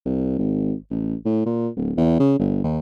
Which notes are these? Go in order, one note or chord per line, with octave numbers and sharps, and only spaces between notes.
C2
G#1
A1
A2
A#2
D1
E2
C#3
G1
D#2